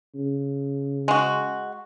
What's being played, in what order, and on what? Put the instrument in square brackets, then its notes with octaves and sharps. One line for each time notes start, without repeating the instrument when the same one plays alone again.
[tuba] C#3
[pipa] G#3 F#4